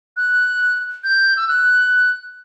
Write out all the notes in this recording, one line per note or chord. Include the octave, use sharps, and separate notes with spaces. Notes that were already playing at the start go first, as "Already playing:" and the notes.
F#6
G6
E6
F#6